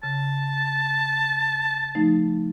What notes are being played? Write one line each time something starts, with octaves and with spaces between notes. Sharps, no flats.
C#3 A5
F3 A3 D#4